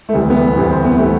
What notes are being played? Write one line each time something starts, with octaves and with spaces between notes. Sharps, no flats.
A3
D2 C3 E3 G3
B3
A3
D2 C3 E3 B3
C4
B3
C3 E3 A3